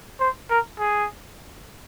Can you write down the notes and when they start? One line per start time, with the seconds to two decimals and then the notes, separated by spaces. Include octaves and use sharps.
0.20 C5
0.50 A#4
0.79 G#4